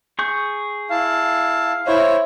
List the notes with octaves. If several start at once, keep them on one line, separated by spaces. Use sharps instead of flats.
G#4 C#6 G6
E4 F5 A5
E4 C5 C#5